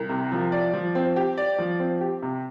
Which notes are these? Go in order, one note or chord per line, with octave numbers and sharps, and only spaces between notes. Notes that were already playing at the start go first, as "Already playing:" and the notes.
Already playing: C2
C3
F3
D5
F3
C4
G4
D5
F3
C4
G4
C3